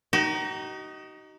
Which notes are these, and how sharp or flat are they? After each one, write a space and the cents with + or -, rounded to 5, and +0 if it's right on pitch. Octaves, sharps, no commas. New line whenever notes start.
D#4 +0 F#4 +45